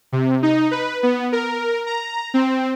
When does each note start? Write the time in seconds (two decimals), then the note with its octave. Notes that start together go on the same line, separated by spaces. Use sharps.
0.12 C3
0.43 D#4
0.71 B4
1.03 B3
1.32 A#4
1.86 A#5
2.34 C4